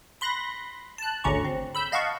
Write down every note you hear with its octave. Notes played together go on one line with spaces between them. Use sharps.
B5 C6 F#6 A#6
A5 F#6
G#1 D2 D3 C#4 A#5 C#6
C4
B5 E6 G6
D#5 F5 F#5 A5 C#6